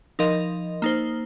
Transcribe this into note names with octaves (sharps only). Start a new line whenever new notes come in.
F3 D#4 A#4 D#5
A#3 D#4 C5